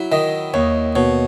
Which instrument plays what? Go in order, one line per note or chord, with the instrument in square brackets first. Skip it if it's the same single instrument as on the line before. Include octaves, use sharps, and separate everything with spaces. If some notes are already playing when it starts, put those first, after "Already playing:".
Already playing: [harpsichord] F#3 [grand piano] E4
[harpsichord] D#3 [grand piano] D#5
[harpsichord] D#2 [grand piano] C#5
[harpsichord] B2 [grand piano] C#5